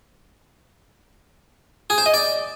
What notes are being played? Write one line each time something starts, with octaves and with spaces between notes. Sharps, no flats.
G#4
C5
D#5
D5